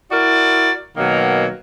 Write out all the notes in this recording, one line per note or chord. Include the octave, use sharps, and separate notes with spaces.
E4 F#4 A#4 D5
B2 D#3 F#3 A#3